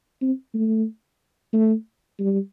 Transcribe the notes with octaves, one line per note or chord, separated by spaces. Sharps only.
C4
A3
A3
G3